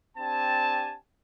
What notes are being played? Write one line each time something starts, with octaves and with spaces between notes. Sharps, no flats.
C4 D4 G4 G#5 A5